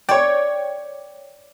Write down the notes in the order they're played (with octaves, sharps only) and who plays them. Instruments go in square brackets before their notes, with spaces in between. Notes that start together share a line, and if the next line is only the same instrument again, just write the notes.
[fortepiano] C#5 G5 [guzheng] D5